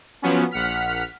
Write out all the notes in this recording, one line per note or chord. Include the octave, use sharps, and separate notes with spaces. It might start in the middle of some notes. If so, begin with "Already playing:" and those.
F3 F#3 B3 C#4
A#1 F#5 F6 B6